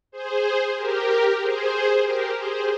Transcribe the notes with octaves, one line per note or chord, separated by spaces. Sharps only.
G#4 C5
G4 A#4
G#4 C5
G4 A#4
G#4 C5